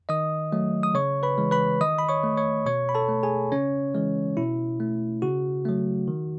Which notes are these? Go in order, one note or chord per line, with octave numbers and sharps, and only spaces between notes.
D#3 D#5 D#6
F#3 A3
D#6
C#3 C#5 C#6
B4 B5
E3 G#3
B4 B5
D#3 D#5 D#6
B5
C#5 C#6
A3
C#5 C#6
B2 C#5 C#6
B5
A4 A5
A3
G#4 G#5
C#3 C#4 C#5
E3 G#3
B2 E4
A3
C#3 F#4
F#3 A3
D#3